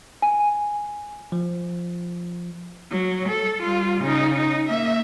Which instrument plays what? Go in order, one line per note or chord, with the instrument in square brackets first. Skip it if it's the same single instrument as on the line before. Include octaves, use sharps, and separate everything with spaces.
[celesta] G#5
[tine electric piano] F3
[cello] F#3
A4
G3 F4
C#3 D#4
D#4
A#3 E5